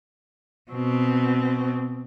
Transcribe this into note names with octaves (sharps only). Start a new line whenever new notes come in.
B2 C4